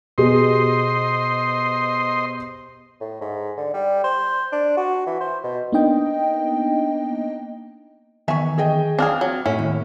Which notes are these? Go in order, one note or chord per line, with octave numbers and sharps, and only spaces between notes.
B2 G4 G#4 C5 D#5 C6
A2
G#2
D3
G3
C5
D4
F#4
E3
C5
B2
A#3 B3 D4 D#4 D#5 G5
E2 D#3 E5 G#5 C#6
G#4 D#5 G5
C4 D4 G#4 F5 F6
F#3
A2 C#4 E4
D#2